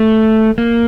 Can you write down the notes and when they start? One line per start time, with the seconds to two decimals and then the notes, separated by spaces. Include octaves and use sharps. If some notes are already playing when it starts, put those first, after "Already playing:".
Already playing: A3
0.58 A#3